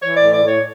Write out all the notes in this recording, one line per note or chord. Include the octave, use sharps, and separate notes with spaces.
E3 C#5
D5
A2
D5
A2 C#5